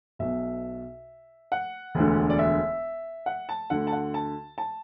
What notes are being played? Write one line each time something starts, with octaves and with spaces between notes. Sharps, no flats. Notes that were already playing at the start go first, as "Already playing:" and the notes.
B1 B2 E5
F#5
E1 D2 D3
D5
E5
F#5
A5
D2 D3 F#5
A5
F#5
A5
A5